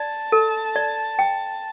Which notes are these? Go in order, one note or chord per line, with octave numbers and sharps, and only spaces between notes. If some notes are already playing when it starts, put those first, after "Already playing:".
Already playing: D5 A5
A4
D5
G5